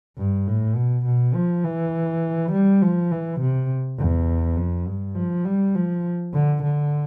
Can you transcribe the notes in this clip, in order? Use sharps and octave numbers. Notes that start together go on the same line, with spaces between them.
G2
A2
B2
B2
F3
E3
G3
F3
E3
C3
E2
F2
G2
F3
G3
F3
D3
D3